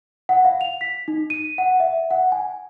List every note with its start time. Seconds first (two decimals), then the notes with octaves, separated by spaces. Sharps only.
0.29 F#5
0.45 F5
0.61 F7
0.81 B6
1.08 D#4
1.30 D#7
1.58 F#5
1.80 E5
2.11 F#5
2.32 G#5